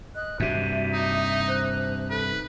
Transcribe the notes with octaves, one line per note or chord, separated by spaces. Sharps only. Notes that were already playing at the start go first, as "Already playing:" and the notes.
D#5 F#6
G2 C3 F#4 E5
D#4
C5 F#6
A4 B4
D#4